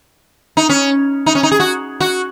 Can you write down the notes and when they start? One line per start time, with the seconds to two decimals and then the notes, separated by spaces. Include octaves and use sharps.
0.57 D#4
0.69 C#4
1.26 D#4
1.35 C#4
1.43 D#4
1.52 G#4
1.60 F#4
2.00 F#4